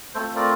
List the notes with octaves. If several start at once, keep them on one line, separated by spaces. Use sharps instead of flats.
A3 C4 F4 A4 C5
A#4 D5